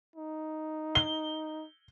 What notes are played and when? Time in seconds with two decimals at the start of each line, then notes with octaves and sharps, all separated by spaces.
0.16 D#4
0.95 G7